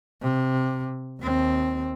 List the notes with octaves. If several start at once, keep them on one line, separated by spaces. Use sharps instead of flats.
C3
D#2 C4